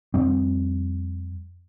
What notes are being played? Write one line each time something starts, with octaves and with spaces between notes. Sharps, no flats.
F2 G3 C4